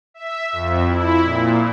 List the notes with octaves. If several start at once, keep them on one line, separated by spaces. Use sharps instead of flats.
E5
F2
E4
A#2